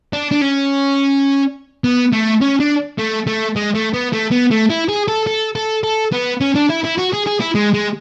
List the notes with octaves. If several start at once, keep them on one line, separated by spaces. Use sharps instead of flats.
D4
D4
C#4
B3
A3
C#4
D4
A3
A3
G#3
A3
B3
A3
B3
A3
E4
G#4
A4
A4
A4
A4
B3
C#4
D4
E4
E4
F#4
G#4
G#4
E4
G#3
G#3